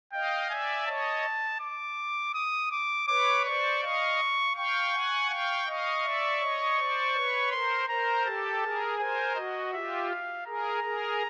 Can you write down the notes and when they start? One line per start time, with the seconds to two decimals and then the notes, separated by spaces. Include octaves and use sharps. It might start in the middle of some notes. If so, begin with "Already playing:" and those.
0.13 D#5 F5 G5
0.50 D5 E5 G#5
0.87 C#5 D#5 A5
1.60 D6
2.34 D#6
2.71 D6
3.08 B4 C#5 D6
3.45 C5 D5 C#6
3.82 D#5 F5 C#6
4.56 F5 G5 C#6
4.93 F#5 G#5
5.29 F5 G5 C#6
5.66 D#5 F5 C#6
6.04 D5 E5
6.41 C#5 D#5
6.78 C5 D5
7.14 B4 C#5
7.51 A#4 C5 C6
7.89 A#4 C5 A#5
8.25 G4 A4 A5
8.62 G#4 A#4
8.99 A#4 C5 G#5
9.35 F#4 D#5
9.73 F4 G4 E5
10.09 F5
10.46 G#4 A#4 A#5
10.83 G#4 A#4